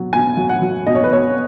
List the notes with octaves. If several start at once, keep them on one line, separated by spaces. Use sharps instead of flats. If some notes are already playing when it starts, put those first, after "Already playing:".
Already playing: B2 F#3
B2 G#5
F#3
F#5
F#3
B2 D#5
C#5
B4
B2 C#5